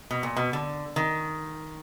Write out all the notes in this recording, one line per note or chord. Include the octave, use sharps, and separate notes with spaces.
B2
A#2
B2
D3
D#3